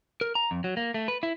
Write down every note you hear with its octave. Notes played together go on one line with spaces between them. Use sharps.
A#4
A#5
F2
F#3
A#3
A3
B4
E4